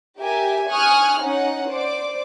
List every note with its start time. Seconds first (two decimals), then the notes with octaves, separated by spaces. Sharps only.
0.19 G4 A#4 E5 G#5
0.71 G#5 C#6 D#6 F6 F#6
1.20 C#4 D#4 F#5
1.69 C5 D5 D6